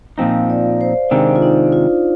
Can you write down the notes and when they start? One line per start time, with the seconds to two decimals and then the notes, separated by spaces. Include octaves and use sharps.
0.18 A#2 F3 C4 D#4 F5
0.50 D5
0.81 C5
1.11 C3 D#3 G#3 C4 D4
1.36 F4
1.42 D#4
1.73 F4